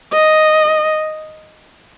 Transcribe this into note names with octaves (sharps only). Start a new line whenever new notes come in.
D#5